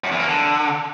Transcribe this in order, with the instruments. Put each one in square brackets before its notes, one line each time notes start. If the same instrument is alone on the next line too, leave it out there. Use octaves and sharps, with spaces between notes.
[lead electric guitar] F#2
E2
A#3
D3